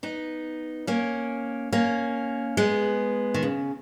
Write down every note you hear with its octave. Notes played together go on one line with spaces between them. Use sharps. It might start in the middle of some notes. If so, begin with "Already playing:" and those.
B3 D#4
A#3 C#4
A#3 C#4
G#3 B3
D#3
C#3